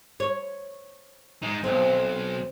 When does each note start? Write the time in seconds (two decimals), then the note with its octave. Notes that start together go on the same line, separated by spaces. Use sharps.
0.20 C#5
1.43 G#3 D#4
1.64 B1 C4